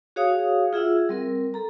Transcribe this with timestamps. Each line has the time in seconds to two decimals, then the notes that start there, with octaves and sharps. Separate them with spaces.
0.16 F#4 G#4 C#5 F5 D#6
0.73 F4 G#4 E5 F#5 E6
1.09 G3 C4 A#4
1.54 A4 A#5